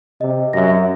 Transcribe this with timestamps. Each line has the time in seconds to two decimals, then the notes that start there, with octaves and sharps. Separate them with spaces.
0.21 C3 D#5
0.53 F#2 E5 A#6